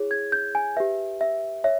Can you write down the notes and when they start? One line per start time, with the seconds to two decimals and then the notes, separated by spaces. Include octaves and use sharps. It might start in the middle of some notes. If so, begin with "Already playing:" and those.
Already playing: E4 G#4 C#5
0.11 G#6
0.32 G6
0.55 G#5
0.76 G4 B4 E5
1.21 E5
1.64 C#5 E5